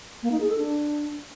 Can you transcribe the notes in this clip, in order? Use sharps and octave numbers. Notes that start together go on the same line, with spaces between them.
A#3
D#4
G#4
A4
D4